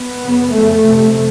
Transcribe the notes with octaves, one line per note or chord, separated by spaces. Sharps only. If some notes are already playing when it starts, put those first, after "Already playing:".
Already playing: B3
F#2 C#3
F2 C#3 A3
F2 C3